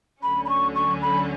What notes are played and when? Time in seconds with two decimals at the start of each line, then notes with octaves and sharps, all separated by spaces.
0.23 D2 D3 F#3 C#4 B5
0.45 B5
0.49 C#6
0.75 C#6
1.02 B5